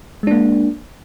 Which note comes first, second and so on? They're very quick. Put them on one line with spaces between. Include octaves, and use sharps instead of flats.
G#3 D4 A#3